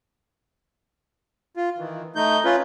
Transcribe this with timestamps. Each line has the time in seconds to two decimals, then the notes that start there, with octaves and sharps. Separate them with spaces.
1.56 F4
1.78 D#3 E3
2.15 A3 D#4 G6
2.44 C#4 F4 B4